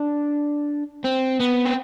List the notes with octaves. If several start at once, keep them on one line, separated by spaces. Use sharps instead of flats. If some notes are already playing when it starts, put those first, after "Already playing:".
Already playing: D4
C4
B3
C4